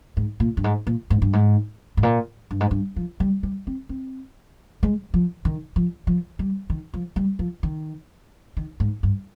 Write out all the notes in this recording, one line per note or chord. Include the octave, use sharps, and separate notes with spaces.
G#2
A#2
G2
G#2
A#2
G#2
G2
G#2
G#2
A#2
G2
G#2
G2
F3
G3
G3
C4
C4
G#3
F3
D#3
F3
F3
G3
D#3
F3
G3
F3
D#3
D#3
G#2
G2